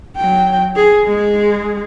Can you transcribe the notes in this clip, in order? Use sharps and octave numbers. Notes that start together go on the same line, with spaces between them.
F#3 G5
G#4
G#3 G#4